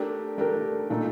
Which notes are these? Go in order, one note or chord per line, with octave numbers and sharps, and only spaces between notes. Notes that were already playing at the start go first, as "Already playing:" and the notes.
Already playing: A3 D4 G4 A#4
A3 D4 G4 A#4
A#2 A3 D#4